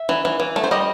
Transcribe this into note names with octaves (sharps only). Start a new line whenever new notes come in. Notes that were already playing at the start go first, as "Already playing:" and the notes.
Already playing: E5
E3
E3
E3
A3
C5
G3 D#5